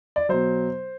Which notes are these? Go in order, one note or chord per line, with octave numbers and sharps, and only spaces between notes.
D5
B2 F#3 C5